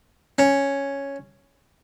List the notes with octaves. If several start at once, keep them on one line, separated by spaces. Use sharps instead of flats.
C#4